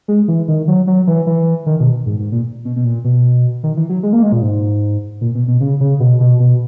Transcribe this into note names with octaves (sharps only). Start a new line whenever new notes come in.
G#3
E3
D#3
F#3
F#3
E3
E3
D#3
B2
G#2
G#2
A#2
B2
B2
A#2
B2
D#3
E3
F#3
G#3
A#3
G#3
A#2
G#2
A#2
B2
B2
C#3
C#3
B2
B2
B2